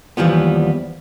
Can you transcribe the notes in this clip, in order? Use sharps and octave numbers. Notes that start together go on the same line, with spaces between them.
D#2 E3 F3 G3 B3